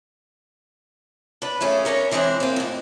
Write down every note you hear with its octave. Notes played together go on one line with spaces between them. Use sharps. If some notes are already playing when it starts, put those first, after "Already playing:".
D4 B4
A3 A#3 C#4 G#4
C#4 D4 A#4 C#5
E3 G#3 C4 D4 G#4
A#3 C4
F2 A2